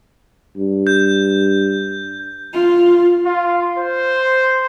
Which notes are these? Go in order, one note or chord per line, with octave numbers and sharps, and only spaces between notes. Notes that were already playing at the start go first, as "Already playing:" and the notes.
G2
G6
F4
F4
C5